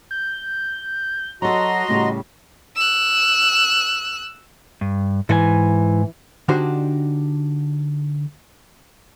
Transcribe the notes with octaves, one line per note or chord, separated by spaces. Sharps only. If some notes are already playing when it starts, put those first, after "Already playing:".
G6
F#3 F#4 A4 D#5 A#5 C6
A2 C#3 G3
E6 F#6
G2
G#2 E3 A4 G#5
D3 D4 D#4 F#4 G4 C5